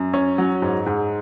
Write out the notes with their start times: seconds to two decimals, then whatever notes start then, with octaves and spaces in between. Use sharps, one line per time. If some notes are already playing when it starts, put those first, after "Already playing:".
Already playing: F#2
0.13 C#4
0.38 F#3
0.62 G#2
0.86 G#2